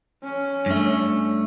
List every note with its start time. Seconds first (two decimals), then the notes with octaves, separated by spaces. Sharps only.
0.24 C#4
0.66 G2 A3